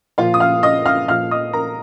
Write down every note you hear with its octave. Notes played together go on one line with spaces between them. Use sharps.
A#2 F3 F4 F5
D#6
F5 F6
D#5 D#6
F5 F6
A#2 F3 F5 F6
D#5 D#6
A#4 A#5